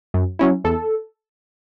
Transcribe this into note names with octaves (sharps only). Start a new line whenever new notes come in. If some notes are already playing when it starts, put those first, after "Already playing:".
F#2
F#3 C#4 E4
E2 A4